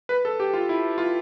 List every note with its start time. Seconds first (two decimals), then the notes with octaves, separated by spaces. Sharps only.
0.09 B4
0.25 A4
0.40 G4
0.54 F4
0.69 E4
0.98 F4